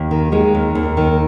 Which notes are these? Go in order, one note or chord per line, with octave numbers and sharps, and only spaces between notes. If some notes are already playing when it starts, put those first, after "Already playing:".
Already playing: D#2
D#3
D#3 G#3
D#2
D#2
D#3